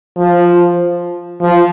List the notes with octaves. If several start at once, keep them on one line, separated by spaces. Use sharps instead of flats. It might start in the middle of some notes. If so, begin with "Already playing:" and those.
F3
F3